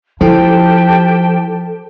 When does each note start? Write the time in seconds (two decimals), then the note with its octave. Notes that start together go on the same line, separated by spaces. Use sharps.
0.21 F3 E4 G4 A4 G5 A5